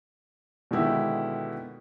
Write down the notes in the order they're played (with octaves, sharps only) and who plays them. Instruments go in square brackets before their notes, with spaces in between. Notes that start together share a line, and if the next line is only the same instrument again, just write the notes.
[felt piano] B2 D3 D#3 G#3 E4 G4